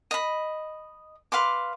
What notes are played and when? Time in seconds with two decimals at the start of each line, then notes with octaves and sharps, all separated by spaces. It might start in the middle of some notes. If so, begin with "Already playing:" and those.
0.11 D#5 B5
1.32 B4 F5 C6 D6